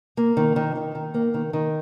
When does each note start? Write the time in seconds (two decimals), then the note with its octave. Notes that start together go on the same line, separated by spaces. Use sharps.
0.17 A#3
0.37 D#3
0.56 D#3
0.75 D#3
0.95 D#3
1.14 A#3
1.34 D#3
1.53 D#3